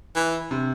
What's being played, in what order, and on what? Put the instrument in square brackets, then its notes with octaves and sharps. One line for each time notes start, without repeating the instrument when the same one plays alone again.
[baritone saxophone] E3
[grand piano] C3